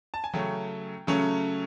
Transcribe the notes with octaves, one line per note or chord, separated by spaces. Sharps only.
A5
G#5
C#3 F#3 A3 C#4 G5
C#3 F#3 A3 C#4